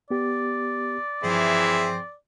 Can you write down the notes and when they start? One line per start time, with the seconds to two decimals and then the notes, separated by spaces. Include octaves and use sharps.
0.10 B3 G4 D5
1.23 G2 E3 F3 C4 G#4 E5